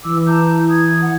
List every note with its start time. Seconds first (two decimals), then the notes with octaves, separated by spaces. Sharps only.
0.05 E3 D6 E6
0.27 A5 A#5 G6
0.69 D#6 G#6
1.03 F#5